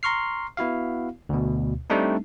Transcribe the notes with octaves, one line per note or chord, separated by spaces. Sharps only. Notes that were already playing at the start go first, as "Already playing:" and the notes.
A#5 C6 C#6 F6 C7
B3 E4 F#4 F5
D2 B2
G3 A3 C4 D4 D#4